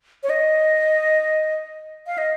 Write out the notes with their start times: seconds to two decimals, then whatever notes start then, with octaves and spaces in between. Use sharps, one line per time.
0.23 C#5
0.30 D#5
2.07 F5
2.18 D#5